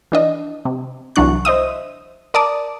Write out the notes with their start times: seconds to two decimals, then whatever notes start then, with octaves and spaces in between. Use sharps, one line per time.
0.12 E3 D4 D#5
0.65 C3
1.16 C2 E3 F#3 D4 C#6 F#6
1.45 C5 D#5 E5 D#6
2.34 A#4 D5 A5 D6 D#6